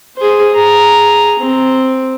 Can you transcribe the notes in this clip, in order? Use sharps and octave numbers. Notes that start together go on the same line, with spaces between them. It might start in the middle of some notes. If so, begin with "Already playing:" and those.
G#4 C5
G#4 A#5
C4